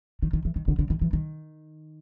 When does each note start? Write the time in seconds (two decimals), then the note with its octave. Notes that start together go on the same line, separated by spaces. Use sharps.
0.22 D#3
0.33 D#3
0.45 E3
0.56 D#3
0.68 D3
0.79 D3
0.90 D#3
1.01 E3
1.13 D#3